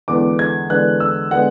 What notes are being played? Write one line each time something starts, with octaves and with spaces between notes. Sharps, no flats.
E2 D3 G#3 B3 D6
G#6
E2 D3 G#3 B3 F#6
E6
D3 G#3 B3 F#5